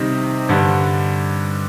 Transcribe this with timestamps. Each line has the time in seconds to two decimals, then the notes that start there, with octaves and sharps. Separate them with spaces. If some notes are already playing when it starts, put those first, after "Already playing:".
Already playing: C3 D#3 G3 C4 D#4
0.49 G2 D3 G3